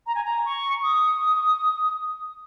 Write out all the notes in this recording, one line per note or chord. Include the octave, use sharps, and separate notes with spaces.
A#5
G#5
A#5
C#6
D#6